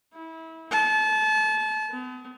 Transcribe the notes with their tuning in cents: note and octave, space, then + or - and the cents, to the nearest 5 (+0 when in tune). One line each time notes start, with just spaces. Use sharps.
E4 -25
A5 -30
B3 +45